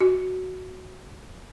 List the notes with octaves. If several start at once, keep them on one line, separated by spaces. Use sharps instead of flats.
F#4